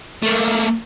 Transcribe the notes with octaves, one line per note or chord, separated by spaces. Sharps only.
A3 A#3